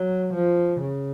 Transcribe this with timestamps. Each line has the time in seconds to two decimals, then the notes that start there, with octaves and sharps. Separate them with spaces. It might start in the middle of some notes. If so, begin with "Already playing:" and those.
Already playing: F#3
0.35 F3
0.83 C#3